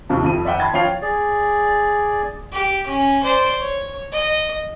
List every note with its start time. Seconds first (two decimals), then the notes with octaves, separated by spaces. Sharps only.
0.10 D#2 C3 F3 A5
0.24 F2 F3 D#7
0.45 D5 E5 F#5 G5
0.60 A5 B5 C6 G#6 A6
0.73 F3 C#5 F5 G5 C7 F7
1.02 G#4 D5
2.52 G4
2.86 C#4
3.23 C5 D5
3.60 C#5
4.12 D#5